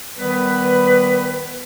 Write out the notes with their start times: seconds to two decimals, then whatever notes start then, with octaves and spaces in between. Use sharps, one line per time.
0.18 D#3 G3 B3 B4